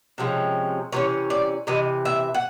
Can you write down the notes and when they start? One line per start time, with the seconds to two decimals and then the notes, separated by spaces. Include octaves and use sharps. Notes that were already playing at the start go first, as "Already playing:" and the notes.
0.18 C3 F3 G#3 C#4
0.93 C3 E3 C#4 C#5
1.30 D5
1.67 C3 E3 D#5
2.05 E5
2.34 F#5